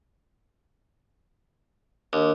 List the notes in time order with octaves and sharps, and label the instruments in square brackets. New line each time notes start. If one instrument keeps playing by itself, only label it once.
[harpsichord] D#2 [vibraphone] D4